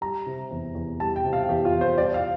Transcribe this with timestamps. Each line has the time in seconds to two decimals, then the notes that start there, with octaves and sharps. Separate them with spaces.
0.01 G3 A#5
0.26 C3
0.51 E2
0.75 E2
1.00 G3 A5
1.16 G5
1.24 C3
1.33 F5
1.49 E2 G4
1.65 F4
1.73 E2
1.81 C5
1.98 G3 D5
2.14 F5